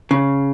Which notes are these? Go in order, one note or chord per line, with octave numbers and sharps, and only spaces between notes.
C#3